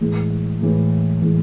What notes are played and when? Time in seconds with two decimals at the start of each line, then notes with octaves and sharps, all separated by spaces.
0.01 A2 E3 G#3
0.61 A2 E3 G#3
1.22 A2 E3 G#3